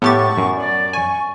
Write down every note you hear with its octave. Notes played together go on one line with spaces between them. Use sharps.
A2 B3 G4 C#6 A6
F#2
D5
G#5 C#6